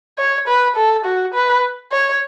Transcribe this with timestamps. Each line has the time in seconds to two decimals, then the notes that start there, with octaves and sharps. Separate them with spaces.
0.18 C#5
0.47 B4
0.76 A4
1.05 F#4
1.34 B4
1.92 C#5